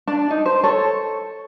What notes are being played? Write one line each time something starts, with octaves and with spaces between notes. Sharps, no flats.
D4
D#4
C5
A4 C#5